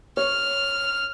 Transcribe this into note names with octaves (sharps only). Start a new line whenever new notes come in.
C#5 F6